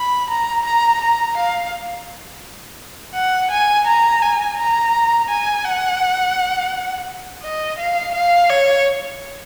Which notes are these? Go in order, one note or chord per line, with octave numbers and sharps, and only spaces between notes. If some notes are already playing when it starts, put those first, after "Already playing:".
Already playing: B5
A#5
A#5
A#5
F5
F#5
G#5
A#5
G#5
A#5
G#5
F#5
D#5
F5
F5
C#5